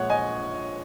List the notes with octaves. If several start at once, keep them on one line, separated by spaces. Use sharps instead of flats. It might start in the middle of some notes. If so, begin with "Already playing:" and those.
Already playing: A#1 A#2 G#3 C#5 F#5
D#5 G#5